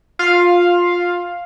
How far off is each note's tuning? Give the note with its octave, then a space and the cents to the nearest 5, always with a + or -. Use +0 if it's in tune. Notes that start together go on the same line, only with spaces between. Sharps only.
F4 +15 F5 +0